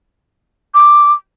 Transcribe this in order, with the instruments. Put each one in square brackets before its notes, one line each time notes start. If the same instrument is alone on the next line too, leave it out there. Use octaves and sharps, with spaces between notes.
[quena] D6